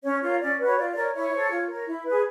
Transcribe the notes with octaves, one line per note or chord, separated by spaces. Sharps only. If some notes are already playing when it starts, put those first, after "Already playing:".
C#4 C#5
F4 A#4 C#5
C#4 D5
F#4 B4
C#5
F4 D5
A#4 C#5 D5
E4 C#5
A4 C5
F4
A#4 C#5
E4
G#4 B4